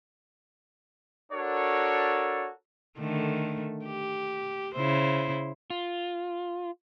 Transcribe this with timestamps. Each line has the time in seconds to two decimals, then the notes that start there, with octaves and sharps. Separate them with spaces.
1.32 D4 F#4 A4 A#4 C#5
2.99 D3 D#3 A3
3.86 G4
4.75 C#3 E4 C5
5.70 F4